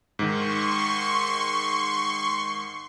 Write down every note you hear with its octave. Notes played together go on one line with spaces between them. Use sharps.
G#2 D#3 C6 C#6